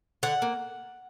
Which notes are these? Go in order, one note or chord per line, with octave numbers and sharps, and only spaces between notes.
D3 F#5
A#3